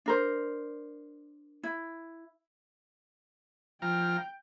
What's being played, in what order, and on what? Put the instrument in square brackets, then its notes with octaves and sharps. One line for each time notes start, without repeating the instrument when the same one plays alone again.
[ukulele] D4 A#4 C5
E4
[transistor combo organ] F3 A#5 F6 [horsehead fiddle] G5